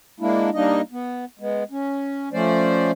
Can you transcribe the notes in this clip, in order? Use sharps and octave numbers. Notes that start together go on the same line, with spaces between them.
G#3 A#3 D4 E4
G3 A#3 D4 D#4 D#5
B3
G#3 B3
C#4
F3 A3 C#4 C5 D5